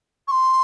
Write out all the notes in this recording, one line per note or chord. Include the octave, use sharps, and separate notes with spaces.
C#6
C6